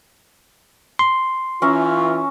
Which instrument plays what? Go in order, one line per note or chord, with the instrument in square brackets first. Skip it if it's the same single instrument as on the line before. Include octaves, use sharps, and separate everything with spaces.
[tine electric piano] C6
[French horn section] E3 F4 [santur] C#4 E5 A#5